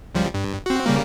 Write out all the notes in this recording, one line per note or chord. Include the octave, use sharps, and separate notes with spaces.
C#2 F3 G3
G2
C4 F#4
C#3 G3 A#3